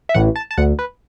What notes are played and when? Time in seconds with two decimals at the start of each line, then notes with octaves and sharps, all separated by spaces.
0.09 E5
0.14 A1 A2 E3 F#5
0.36 A5
0.51 A5
0.58 D2 D3 F#5
0.79 B4